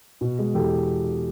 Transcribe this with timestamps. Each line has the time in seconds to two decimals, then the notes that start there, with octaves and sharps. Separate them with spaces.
0.21 B2
0.39 G#3
0.54 E2 G4 A4